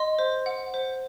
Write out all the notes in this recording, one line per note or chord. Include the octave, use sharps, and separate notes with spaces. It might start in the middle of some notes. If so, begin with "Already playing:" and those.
Already playing: D#5 C6
C5
F#5
C5